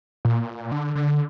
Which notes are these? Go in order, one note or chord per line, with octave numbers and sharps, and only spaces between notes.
A#2
D3
D3